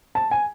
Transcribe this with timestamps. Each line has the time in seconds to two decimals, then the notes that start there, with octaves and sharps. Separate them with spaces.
0.15 A5
0.31 G#5